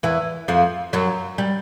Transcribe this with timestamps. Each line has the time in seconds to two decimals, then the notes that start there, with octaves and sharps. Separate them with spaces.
0.03 E2 E3
0.48 F2 F3
0.93 F#2 F#3
1.38 G3